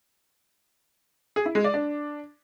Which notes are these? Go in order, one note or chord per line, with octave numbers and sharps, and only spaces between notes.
G#4
E4
G#3
D5
D4